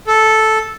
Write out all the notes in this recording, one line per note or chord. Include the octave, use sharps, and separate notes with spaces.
A4